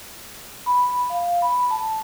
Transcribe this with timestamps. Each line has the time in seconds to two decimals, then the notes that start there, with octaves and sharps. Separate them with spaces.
0.66 B5
1.10 F5
1.42 B5
1.71 A5